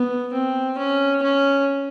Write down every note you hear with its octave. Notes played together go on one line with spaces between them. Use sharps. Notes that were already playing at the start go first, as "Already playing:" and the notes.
Already playing: B3
C4
C#4
C#4